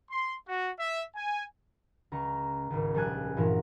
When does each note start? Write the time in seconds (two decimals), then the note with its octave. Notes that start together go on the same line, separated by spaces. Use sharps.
0.11 C6
0.47 F#4
0.79 E5
1.16 G#5
2.12 C#2 A#5 C#6
2.70 G#1 C#2
2.94 A#1 G3 A4 G#5 F#6
3.37 G2 A#2 E3 E4 F#4 A#4